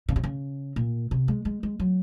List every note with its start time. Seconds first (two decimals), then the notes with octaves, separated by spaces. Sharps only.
0.09 C#3
0.16 C3
0.24 C#3
0.76 A#2
1.11 C3
1.28 G#3
1.45 G#3
1.63 G#3
1.79 F#3